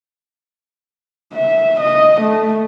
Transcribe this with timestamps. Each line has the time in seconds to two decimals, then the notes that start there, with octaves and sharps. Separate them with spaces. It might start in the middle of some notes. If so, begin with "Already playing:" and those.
1.34 E5
1.81 D#5
2.21 A3